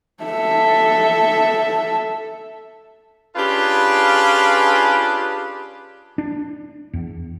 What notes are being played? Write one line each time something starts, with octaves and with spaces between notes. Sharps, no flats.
A4 E5
C#4 D4 F4 G4 G#4 B4
D4
E2